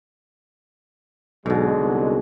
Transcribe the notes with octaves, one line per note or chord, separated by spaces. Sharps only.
B1 G#2 B2 D3 F#3 G#3
C2